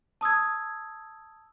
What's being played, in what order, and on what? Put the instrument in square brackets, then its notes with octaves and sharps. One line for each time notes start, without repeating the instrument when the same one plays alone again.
[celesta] A5 D#6 E6 G#6